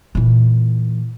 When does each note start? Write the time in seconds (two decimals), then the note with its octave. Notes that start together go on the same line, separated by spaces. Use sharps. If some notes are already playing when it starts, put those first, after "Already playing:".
0.15 A#2 E3